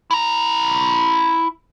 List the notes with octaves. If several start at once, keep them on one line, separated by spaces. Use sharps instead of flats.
E4 A#5